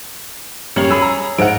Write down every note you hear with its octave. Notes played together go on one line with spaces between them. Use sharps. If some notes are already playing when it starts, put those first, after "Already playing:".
F#2 G3 C#5 F5 F#7
G#4 B5 E6
A#5
G#2 A#4 F#5 D7